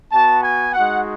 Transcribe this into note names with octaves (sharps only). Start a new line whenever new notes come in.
B3 F#4 A5
G#5
G#3 D#4 F#4 F#5